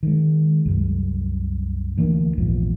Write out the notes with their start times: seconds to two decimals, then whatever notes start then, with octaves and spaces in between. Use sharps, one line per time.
0.03 D#3 G#3
0.66 C2 F#2
1.98 D2 E3 A#3 D4
2.38 A#1 E2 G#2 F3